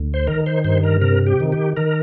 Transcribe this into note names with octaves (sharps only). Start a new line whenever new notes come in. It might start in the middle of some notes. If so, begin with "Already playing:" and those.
Already playing: D2
C5
D#3 A#4
C5
G2 C5
A#4
C3 A#4
G4
D#3
G4
D#3 A#4